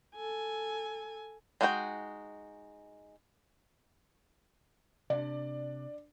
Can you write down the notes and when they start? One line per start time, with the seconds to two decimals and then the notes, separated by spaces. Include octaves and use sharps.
0.15 A4 G#5
1.61 G#3 D#4 F#4 C5 G5
5.10 C3 D4 D5